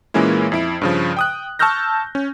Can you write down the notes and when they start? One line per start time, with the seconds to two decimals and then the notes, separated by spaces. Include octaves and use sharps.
0.14 A#2 E3 G#3 A#3 C#4 E4
0.52 F2 E4 D7
0.81 G2 C#3 F3
1.17 G5 D#6 F#6
1.59 A5 C#6 E6 F6 G6 A#6
2.15 C#4